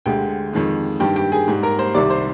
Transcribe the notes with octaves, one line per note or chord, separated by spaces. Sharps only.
D2 D3 G#3 G4 G5
F2 D#3 G#3
G2 D#3 G3 G4 G5
G4 G5
G#4 G#5
G#2 G3
A#4 A#5
C5 C6
C2 C3 D#3 G3 D5 D6
C5 C6